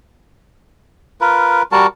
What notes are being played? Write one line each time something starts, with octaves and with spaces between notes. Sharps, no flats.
F4 A#4 B4
G3 F#4 A#4 A5